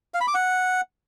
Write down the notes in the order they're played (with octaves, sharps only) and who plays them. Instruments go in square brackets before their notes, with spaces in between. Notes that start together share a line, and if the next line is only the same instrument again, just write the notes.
[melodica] F5
B5
D6
F#5